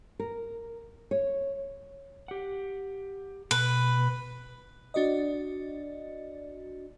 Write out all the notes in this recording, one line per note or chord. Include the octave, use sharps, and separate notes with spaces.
A#4
C#5
G4 F#5
B2 B4
D4 F#4 D5 D#5